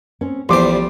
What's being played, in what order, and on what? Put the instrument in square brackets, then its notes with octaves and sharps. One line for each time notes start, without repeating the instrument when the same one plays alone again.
[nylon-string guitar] C4 C#4
[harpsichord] A1 E2 C5 [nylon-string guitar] F3 [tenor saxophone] G3 [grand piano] C6 D6